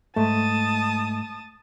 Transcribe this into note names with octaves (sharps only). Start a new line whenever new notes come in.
G#2 A3 A5 D#6